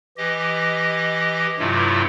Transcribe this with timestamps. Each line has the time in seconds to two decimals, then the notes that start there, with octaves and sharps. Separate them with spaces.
0.17 E3 G4 D#5
1.59 G2 C3 F#3 A3 E4 F4